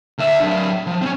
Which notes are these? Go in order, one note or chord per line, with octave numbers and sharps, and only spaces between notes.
D2 E5
F#3 D4
F3
C4 C#4